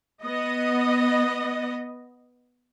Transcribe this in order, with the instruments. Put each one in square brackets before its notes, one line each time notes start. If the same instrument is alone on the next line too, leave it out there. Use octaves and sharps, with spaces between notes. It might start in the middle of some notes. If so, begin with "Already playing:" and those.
[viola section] B3 D#5